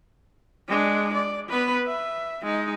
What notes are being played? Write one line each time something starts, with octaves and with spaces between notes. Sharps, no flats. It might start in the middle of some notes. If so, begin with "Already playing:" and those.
G#3 D4
D5
B3 B4
E5
G#3 D#4